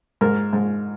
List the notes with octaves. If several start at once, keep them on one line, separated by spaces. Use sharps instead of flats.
G#2 A#4
G#2